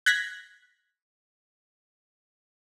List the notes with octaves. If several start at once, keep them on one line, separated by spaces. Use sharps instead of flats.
F#6 G#6 A#6 B6